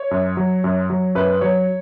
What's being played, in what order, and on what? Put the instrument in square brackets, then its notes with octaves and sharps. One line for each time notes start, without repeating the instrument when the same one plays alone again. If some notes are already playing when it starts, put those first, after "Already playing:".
Already playing: [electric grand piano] C#5
F#2
F#3
F#2
F#3
F#2 B4
F#3 C#5